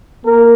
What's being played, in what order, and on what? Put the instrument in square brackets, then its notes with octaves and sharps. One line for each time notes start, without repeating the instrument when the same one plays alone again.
[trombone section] A#3 A#4